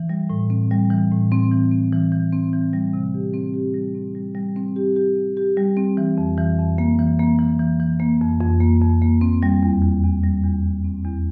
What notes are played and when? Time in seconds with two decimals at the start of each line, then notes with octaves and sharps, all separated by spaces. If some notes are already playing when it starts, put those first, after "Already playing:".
Already playing: E3
0.10 G3
0.30 A2
0.50 C4
0.71 G3
0.90 E3
1.12 A2
1.32 C4
1.51 E3
1.71 C4
1.93 E3
2.12 E3
2.32 C4
2.53 E3
2.73 G3
2.93 C3
3.14 G4
3.34 C4
3.54 G4
3.74 G3
3.95 C4
4.15 G3
4.35 G3
4.56 C4
4.76 G4
4.96 G4
5.16 C4
5.37 G4
5.57 G3
5.77 C4
5.97 E3
6.18 F2
6.38 E3
6.59 F2
6.78 A#3
6.99 E3
7.19 A#3
7.39 E3
7.59 E3
7.80 E3
8.00 A#3
8.21 F2
8.40 F2
8.61 A#3
8.82 F2
9.02 A#3
9.21 C4
9.43 G3
9.63 E2
9.82 E2
10.04 E2
10.24 G3
10.44 E2
10.64 E2
10.84 C4
11.04 E2